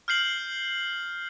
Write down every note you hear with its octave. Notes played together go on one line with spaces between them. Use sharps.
F6 G6 C7 F#7